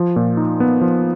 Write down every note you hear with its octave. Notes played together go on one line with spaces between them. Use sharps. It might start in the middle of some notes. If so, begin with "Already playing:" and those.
Already playing: F3
A#2
D#4
B3
F3